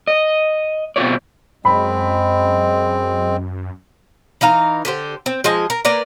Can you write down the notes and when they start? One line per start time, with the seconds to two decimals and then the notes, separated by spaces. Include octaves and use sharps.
0.07 D#5
0.96 B2 C4 F4 C#5 D5
1.65 F#2 G#3 C4 B5
4.41 E3 D#4 F5 A#5
4.85 D3 G4 C5
5.26 C4
5.44 F3 G#3 D#5 G#5
5.70 A#4
5.85 A#3 B4 D5 A#5